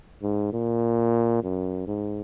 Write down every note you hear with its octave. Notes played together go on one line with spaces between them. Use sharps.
G#2
A#2
F#2
G#2